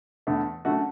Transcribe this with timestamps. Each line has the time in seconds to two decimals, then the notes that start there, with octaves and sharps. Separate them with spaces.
0.27 E2 D3 A3
0.65 F#2 D3 A3 F#4